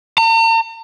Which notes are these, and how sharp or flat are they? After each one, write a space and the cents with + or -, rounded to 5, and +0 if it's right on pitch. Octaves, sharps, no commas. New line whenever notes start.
A#5 -45